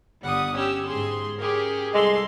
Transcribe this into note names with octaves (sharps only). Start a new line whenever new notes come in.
G1 G3 F#5 D#6
C#4 G4 E6
G#2 G#4 C6
C#4 G4 G#4 A#4
C2 G#3 A4 C6